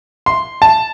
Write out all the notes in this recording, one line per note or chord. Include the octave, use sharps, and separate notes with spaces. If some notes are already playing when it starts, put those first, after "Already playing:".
C6
A5